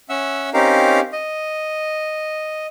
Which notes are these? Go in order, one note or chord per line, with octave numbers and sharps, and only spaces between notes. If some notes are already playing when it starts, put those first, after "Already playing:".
C#4 E5 F#5 E6
C4 C#4 D#4 G4 A#4 F5
D#5